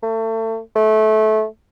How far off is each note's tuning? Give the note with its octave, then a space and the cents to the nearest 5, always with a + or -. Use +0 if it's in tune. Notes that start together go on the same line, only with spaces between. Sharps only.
A3 +30
A3 -20